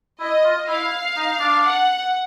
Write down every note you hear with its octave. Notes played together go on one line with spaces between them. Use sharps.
E4 D#5
F4
E4 F5
D#4
D4
F#5